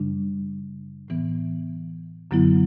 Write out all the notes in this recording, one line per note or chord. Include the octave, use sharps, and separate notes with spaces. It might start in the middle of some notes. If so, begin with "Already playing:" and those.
Already playing: F#2 C#3 G3 D4
A2 E3 B3
F#2 D3 F#3 B3 E4